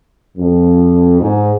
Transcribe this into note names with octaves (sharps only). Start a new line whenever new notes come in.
F2
G#2